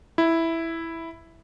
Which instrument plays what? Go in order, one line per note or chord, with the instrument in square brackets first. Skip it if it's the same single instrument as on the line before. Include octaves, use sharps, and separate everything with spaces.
[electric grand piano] E4